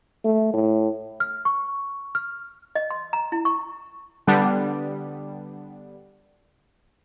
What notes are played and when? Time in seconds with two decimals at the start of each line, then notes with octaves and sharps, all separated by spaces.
0.25 A3
0.54 A2
1.20 F6
1.45 C#6
2.15 F6
2.75 D#5
2.90 C6
3.13 A#5
3.32 E4
3.45 C#6
4.27 D3 G3 B3 D4